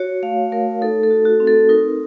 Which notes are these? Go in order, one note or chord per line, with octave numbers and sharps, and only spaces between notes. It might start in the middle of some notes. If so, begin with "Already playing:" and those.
Already playing: F#4 C#5
A3 F5
A3 A#4
D#4 A4
A4
F#4
F#4
C4
A4
D#4 A#4